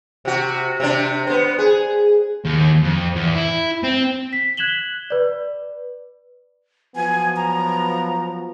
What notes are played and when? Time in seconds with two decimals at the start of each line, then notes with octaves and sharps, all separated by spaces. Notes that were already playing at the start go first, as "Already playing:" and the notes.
0.25 C3 F#4
0.80 C3 D4
1.27 B3 C5
1.59 G#4
2.45 D#2
2.83 F2
3.15 E2
3.35 E4
3.84 C4
4.33 B6
4.57 F#6 G#6 B6 E7 F#7 G7
5.10 B4 D5
6.96 F3 F#3 B3 G#5
7.36 A#5